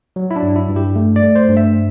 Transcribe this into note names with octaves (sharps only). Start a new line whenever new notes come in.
F#3
E4
D4
G2
E4
G2
G4
A3
D5
A3
C5
G2
E5